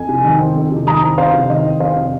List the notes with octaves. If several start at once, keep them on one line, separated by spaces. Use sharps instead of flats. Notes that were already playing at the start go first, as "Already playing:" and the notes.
Already playing: F2 G#5
C3
D#3
C4
F2
C3
D#3 A#5 D#6
C4
F2 C5 F5
C3
D#3 D#5
C4
F2 C5 F5
C3